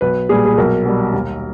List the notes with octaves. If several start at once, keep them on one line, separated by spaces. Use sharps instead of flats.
B1 B4
A#2 G3 G#4
G#4
B1 A#4
B2 G3
D#2